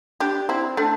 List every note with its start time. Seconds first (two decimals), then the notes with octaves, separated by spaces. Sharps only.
0.20 D4 G4
0.49 C4 E4
0.77 A3 D4